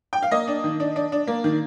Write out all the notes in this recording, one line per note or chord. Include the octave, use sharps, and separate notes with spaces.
G5
F5
A#3 D#5
D4
D#3
D4
D4
D4
A#3
D#3